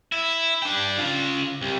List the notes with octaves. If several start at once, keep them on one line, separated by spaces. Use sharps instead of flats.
E4
D4 G5
C#3 F4
C2